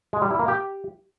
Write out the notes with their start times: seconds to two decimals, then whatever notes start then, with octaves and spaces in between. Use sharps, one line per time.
0.13 G#3
0.22 G3
0.31 E4
0.39 A#3
0.48 G4